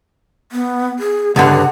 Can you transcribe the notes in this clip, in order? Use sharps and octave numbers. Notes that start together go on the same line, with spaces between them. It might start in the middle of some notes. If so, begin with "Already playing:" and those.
B3
G#4
C#2 G2 D3 F#5